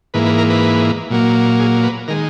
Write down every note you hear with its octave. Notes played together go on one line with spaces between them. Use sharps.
G#2 E3 A#3 B4
B4
A#4
B4
A#2 F#3 A#3
G#4
B4
D#3 G#3 A#4